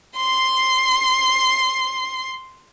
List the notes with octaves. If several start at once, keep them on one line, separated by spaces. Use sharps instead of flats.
C6 C7